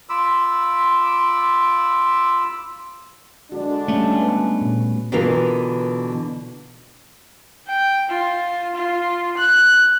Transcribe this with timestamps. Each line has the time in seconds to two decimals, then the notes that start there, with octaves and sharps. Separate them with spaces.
0.09 F4 B5 D6 E6
3.52 D3 G#3 D4 F#4
3.88 G3 A3 C#4
4.20 B3 B4
4.61 A#2
5.12 B2 D3 E3 B3 F4 A#4
7.67 G5
8.09 F4
8.75 F4
9.37 F#6